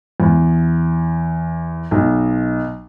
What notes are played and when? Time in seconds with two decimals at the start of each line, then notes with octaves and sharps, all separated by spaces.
0.20 E2
1.91 B1